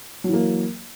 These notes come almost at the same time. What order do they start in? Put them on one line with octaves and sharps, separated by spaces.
F#3 E3 A#3